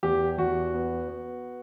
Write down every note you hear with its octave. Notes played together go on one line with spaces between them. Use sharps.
E2 G4
E2 F#4
B3
B3